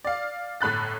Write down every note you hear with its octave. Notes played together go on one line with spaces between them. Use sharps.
D5 F5
G1 A2 B5 F#6 A6